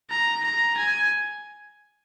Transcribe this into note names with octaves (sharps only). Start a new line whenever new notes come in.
A#5
A#5
G#5